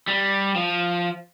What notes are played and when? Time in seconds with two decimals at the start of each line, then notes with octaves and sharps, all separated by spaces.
0.08 G3
0.56 F3